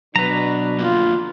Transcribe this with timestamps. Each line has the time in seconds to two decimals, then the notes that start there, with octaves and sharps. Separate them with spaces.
0.16 B2 F#3 D4 B4 A#5
0.79 D3 F3 A#3 F4